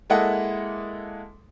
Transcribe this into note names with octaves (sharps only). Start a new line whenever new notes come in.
G#3 A#3 E4 A4 D#5 F#5